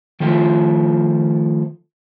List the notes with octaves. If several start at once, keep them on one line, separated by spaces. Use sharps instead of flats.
D#3 F3 A3 F4